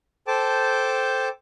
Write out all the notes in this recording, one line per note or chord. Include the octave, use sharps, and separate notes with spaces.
A4 C5 G5 A5 D6